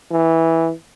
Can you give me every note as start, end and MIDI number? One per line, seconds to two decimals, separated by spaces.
0.11 0.71 52